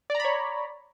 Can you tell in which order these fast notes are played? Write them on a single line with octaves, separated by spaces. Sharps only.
D5 A#5 B5 C#5